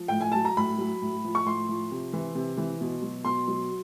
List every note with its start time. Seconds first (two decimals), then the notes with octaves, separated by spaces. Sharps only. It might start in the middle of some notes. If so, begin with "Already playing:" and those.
Already playing: F3
0.08 A2 G5
0.21 G#5
0.32 F#3 A5
0.45 A#5
0.57 A2 B5
0.78 F#3
1.02 A2
1.24 F3
1.35 C#6
1.45 A2 C6
1.69 F3
1.91 C3
2.13 E3
2.35 C3
2.57 E3
2.81 B2
3.02 F#3
3.25 B2 C6
3.48 F#3